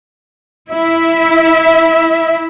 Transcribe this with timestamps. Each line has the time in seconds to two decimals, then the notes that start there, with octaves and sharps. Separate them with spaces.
0.69 E4 E5